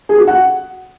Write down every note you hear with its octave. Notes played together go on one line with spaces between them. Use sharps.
G#4
F#4
F#5